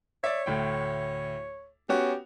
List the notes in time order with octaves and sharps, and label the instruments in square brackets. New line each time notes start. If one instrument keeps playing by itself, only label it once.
[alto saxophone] C#5 [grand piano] D5 E5
[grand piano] D2 A2 G5
[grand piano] B3 C#4 F#4 [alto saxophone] G4